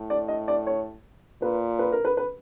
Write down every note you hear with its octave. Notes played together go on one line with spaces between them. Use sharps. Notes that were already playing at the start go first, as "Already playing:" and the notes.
Already playing: A2
D5
D#5
D5
C#5
A#2 B4
B4
A#4
B4
B4